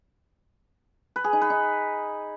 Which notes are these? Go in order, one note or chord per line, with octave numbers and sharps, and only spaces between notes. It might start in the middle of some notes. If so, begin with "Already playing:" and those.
B4
G#4
D#4
B4
D#4